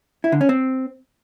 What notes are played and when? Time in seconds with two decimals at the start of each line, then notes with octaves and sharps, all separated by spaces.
0.24 E4
0.32 D3
0.41 C#4
0.49 C4